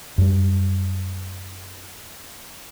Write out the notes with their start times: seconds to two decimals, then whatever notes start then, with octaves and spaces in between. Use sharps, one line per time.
0.18 F#2 G3